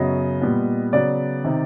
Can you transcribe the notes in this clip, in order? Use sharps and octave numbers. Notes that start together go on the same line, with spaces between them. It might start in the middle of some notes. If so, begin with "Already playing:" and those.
Already playing: F#2 C#3 F#3 B3 D#5
A#2 G3 B3
C#3 F#3 B3 D5
C3 D#3